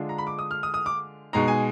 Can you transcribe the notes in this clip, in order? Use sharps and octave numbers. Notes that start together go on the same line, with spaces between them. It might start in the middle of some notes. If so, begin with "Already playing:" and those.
Already playing: D3 G#3 D4 F4
A#5
B5
D6
D#6
F6
D#6
D#6
D6
B2 G#3 D#4 A#5
G#5